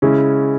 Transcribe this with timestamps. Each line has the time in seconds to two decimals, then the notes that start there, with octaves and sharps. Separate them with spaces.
0.02 C#3 G#3 C#4 E4